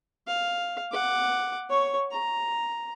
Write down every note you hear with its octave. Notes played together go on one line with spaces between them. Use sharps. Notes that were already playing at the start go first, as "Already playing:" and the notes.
F5
F#5 D6
C#5 C#6
A#5